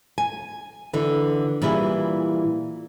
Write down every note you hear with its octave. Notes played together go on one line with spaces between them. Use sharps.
G#5
D3 E3
A#2 E3 G3 E4 G#4